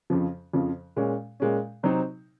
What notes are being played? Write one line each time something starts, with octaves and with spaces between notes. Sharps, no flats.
F2 C#3 F3
F2 C#3 F3
A#2 G#3 C#4
A#2 G#3 C#4
C3 F#3 C4 D#4